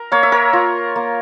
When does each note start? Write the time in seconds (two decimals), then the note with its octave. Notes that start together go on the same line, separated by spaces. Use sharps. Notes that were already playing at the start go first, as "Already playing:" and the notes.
Already playing: A#4
0.12 A#3 C#5 F5
0.23 E5
0.32 A#4 C#5
0.53 F4
0.96 A#3